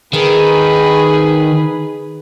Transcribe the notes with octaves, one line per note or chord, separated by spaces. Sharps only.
D#3 G#4 B4